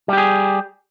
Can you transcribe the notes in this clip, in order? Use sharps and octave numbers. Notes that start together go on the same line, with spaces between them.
G3 G4 G#4